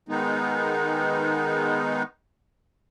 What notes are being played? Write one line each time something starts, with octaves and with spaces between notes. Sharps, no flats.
D#3 G#3 B3 D#4